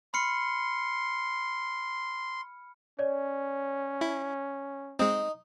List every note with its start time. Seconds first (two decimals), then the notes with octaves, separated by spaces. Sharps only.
0.14 B5 C6 F6 C#7
2.99 C#4 C#5 D5
4.01 E4
4.99 G#3 C4 D#4